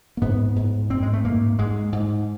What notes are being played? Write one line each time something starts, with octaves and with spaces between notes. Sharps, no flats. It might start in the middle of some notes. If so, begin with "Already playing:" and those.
A#3
G#2 B3
G#2
G#2 C4
G#3
A3
G#2 A#3
G#2 G#3
G#2